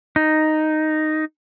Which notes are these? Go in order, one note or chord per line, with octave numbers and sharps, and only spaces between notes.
D#4